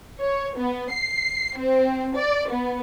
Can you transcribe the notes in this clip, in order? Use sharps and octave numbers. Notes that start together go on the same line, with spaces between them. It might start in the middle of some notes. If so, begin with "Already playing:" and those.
C#5
B3
C7
C4
D5
B3